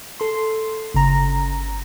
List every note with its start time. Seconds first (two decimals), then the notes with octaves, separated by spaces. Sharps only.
0.20 A4 C6
0.94 G1 C#3 A#5